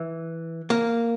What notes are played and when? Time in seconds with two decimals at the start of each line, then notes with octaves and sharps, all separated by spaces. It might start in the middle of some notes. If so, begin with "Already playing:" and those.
Already playing: E3
0.70 A#3